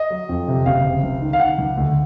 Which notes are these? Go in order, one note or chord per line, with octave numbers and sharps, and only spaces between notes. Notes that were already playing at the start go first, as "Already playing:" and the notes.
Already playing: D#5
F#3
F2
C3
F#1 F5
C3
C#2
D#3
F5
D#3 F#5
C#2
D2